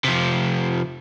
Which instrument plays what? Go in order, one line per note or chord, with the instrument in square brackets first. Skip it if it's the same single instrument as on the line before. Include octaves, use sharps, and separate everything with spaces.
[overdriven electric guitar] C3 F3